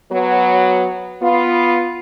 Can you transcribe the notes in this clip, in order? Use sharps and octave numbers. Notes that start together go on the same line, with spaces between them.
F#3 B3
B3 F4